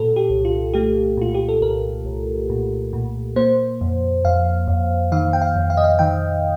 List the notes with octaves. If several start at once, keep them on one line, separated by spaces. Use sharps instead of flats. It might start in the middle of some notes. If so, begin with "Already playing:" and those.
Already playing: A#2 A4
G4
C2
F4
A3 G4
A#2 F4
G4
A4
C2 A#4
C2
A#2
A#2
A#3 C5
F2
F2 F5
F2
D#3 F5
G5
F5
F2
F5
D#5
F5
D#3 G5